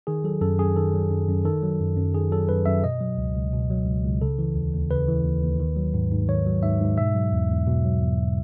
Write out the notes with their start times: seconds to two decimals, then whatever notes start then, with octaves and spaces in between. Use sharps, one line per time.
0.07 D#3 G#4
0.24 F#3 A4
0.41 F#2 A4
0.59 F#2 G#4
0.76 D#3 A4
0.94 F#3
1.10 F#2
1.29 F#2
1.45 D#3 A4
1.62 F#3
1.80 F#2
1.97 F#2
2.14 D#3 G#4
2.32 F#3 A4
2.49 F#2 B4
2.66 F#2 E5
2.84 B2 D#5
3.01 F#3
3.18 C#2
3.35 C#2
3.53 B2
3.70 F#3
3.86 C#2
4.04 C#2
4.21 C#3 A4
4.39 E3
4.55 D#2
4.74 D#2
4.91 C#3 B4
5.08 E3
5.25 D#2
5.43 D#2
5.60 D#3
5.76 F#3
5.94 G#2
6.12 G#2
6.28 D#3 C#5
6.46 F#3
6.63 G#2 E5
6.81 G#2
6.98 B2 E5
7.15 F#3
7.33 E2
7.49 E2
7.67 B2
7.84 F#3
8.02 E2